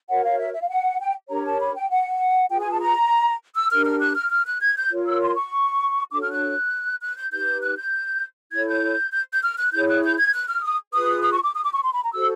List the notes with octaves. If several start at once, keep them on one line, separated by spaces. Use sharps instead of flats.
F#4 A#4 C#5 F#5
F5
E5
E5
F5
F#5
G5
D4 G4 A#4 C#5 A#5
A5
B5
G5
F#5
F4 G#4 B4 G5
G#5
A5
A#5
E6
D4 G4 A#4 F6
F6
F#6
F6
F6
F#6
G#6
G6
F4 A#4 C#5
E6
C6
C#6
D4 F#4 A4 C#5 D6
F6
F#6
F#6
G6
D#4 G4 B4 G6
F#6
G6
E4 A4 C#5 G#6
G6
G6
G6
F6
F#6
E4 G#4 C#5 G6
F#6
G6
G#6
F#6
F6
D#6
F4 G#4 B4 D#6
D#6
C#6
D6
D#6
D6
C#6
C6
B5
A#5
F#4 A4 C5 E6